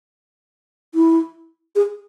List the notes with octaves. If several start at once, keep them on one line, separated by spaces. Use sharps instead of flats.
E4
G#4